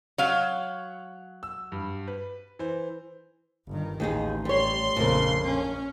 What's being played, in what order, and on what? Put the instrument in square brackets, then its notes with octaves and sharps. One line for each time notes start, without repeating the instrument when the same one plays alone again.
[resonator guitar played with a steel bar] F#3 F5 [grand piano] C#5 F#5
[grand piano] E6
G2
B4
E3 C5
[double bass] G1 D#3
[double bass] A1 [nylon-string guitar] D#2 D#4 G#4
[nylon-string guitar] G3 C#5 [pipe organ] C6
[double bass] A#1 C#3 [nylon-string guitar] F2 A#3
[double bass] C#4